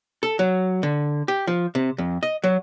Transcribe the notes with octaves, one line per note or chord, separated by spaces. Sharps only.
A4
F#3
D3
G4
F3
C3
F2
D#5
F#3